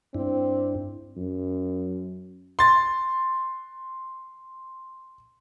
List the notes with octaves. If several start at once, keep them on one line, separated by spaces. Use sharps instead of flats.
G2 C4 D4 E4
F#2
C6 A6